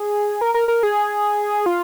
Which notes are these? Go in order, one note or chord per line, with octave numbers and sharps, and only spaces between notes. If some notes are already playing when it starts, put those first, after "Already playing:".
Already playing: G#4
A#4
A#4
A#4
G#4
F4